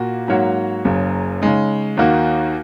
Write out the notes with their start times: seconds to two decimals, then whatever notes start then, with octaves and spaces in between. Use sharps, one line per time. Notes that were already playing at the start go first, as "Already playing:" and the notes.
Already playing: A#2 A#3 F#4
0.28 G#2 F#3 A#3 F#4 C#5
0.85 F#1 F#2 C#3
1.42 C#3 G#3 D#4
1.97 D#2 D#3 A#3 F#4